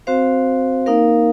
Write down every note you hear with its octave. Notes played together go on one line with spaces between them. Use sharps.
C4 F#4 C5 F5
A#3 D#4 A#4 F5